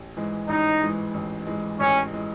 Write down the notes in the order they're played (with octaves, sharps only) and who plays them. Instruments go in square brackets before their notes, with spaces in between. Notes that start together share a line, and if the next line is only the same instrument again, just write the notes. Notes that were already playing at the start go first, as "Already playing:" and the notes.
Already playing: [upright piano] A1
G#2 E3 G#3
[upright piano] A1 [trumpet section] D#4
[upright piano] G#2 E3 G#3
A1
G#2 E3 G#3
[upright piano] A1 [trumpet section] C#4
[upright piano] E3 G#3